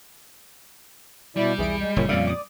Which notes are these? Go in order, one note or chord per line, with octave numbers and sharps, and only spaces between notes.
B2 G3 E4 D5
B1 E2 E4 G#4 D7
G#3
F#1 A#2 G#3 C#5 C#7
F2 A#2 C#3 D5 E5 F5
D6 D#6